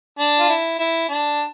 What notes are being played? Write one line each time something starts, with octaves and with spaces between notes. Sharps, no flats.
D4
F4
E4
E4
D4